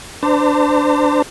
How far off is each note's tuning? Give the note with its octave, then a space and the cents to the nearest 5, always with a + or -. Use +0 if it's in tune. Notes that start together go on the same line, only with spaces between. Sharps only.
D4 +0 C5 -35 A5 +45